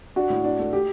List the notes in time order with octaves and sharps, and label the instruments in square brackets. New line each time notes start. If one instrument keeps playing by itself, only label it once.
[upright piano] D4 [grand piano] F#4
[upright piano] A2
D4
A3
[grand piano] G4